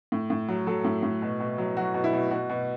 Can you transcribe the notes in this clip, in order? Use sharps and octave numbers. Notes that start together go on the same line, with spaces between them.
A2
A2
F#3
F#3 A4
A2
A2
B2
B2
F#3
F#3 F#4
B2
E4
B2
B2 F#4
B2